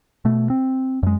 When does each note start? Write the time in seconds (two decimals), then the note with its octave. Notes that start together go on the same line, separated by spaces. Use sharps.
0.25 B2 A3
0.50 C4
1.03 F#2 G#3